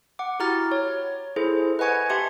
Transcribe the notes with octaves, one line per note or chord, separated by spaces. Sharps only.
F#5 D6
E4 F#4 G4 A#5 F6 A6
C#5
E4 G#4 A4 C5
B4 D#5 F#5 G#5 C#6 G#6
G4 E5 A5 C6 G#6 C#7